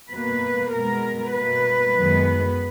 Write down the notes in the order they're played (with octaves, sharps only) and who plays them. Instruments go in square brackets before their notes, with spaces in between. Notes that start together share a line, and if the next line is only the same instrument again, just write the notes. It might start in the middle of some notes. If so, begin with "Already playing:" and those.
[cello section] B2 A#3 B4
B2 G#3 B3 A#4
B2 A#3 B4
F#2 D#3 G#3 B3